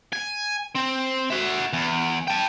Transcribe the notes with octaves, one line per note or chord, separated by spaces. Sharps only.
G#5
C4
F#4 E5
E2
G5 A5